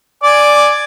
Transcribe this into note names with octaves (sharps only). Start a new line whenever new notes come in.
D5 G#5 D6